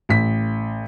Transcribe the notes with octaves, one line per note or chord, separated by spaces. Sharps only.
A1 B6